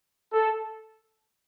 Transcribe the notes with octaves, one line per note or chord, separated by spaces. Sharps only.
A4